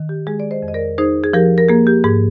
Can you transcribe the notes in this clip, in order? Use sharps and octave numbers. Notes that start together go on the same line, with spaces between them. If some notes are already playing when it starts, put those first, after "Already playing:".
Already playing: D#3
G4
G#3 G#4
D5
C5 D#5
F2
D#5
A#4 D5
D#4 G#4 C5
G#4
F3 G4 A#4
A#4
A#3 G#4
G4
G#2 G#4